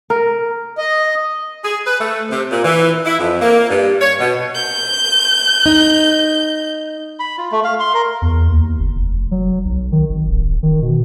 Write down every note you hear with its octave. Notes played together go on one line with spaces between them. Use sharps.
A#4
D#5
G#4
B4
A3
C3
A#2
E3
E4
F2
A#3
G2
C#5
B2
G6
D#4
B5
F4
A3
F5
C6
A#4
E2
D#2
F#1
F1
F#3
B1
D#3
G#1
D1
D#3
B2